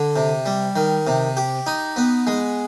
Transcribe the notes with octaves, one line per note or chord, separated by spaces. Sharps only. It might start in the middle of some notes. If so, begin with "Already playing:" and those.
Already playing: D3
C3
G3
D#3
C3
G4
D#4
B3
G#3